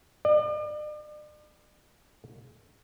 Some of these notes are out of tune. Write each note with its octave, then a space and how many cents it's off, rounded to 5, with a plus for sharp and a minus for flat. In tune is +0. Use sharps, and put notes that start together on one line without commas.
D5 +40